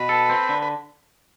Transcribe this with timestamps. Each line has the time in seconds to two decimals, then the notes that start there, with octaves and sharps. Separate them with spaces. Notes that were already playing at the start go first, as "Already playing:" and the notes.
Already playing: B2 B4
0.09 A4
0.30 C4
0.49 D3
0.62 B4